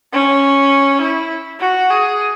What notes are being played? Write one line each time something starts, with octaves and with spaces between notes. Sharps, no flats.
C#4
E4
F#4
G#4